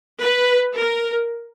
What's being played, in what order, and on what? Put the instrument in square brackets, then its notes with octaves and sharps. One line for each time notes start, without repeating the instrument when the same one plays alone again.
[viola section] B4
A#4